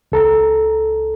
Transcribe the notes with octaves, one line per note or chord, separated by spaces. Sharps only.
C#2 A4 A#5